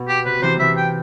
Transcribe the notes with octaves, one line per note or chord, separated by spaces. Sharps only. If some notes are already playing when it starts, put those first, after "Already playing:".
Already playing: B2
G4
C3 B4
C3 E3 C5
C3 E3 E5
G5